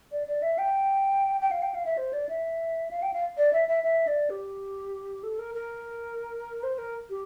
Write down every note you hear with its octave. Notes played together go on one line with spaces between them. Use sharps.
D5
D5
E5
G5
G5
F5
G5
F5
E5
C5
D5
E5
F5
G5
F5
D5
E5
E5
E5
D5
G4
A4
A#4
A#4
C5
A#4
G4